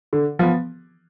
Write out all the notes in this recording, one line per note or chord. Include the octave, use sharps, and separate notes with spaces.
D3
F3 B3